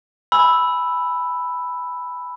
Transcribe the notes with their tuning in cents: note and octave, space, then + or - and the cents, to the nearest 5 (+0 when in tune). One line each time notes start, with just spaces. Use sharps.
G#5 +5 B5 +0 E6 +0